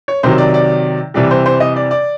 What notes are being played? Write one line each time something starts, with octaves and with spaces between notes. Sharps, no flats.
C#5
C3 D#3 F#3 C5
D5
D5
C3 E3 G3 D5
C5
C5
D#5
D5
D5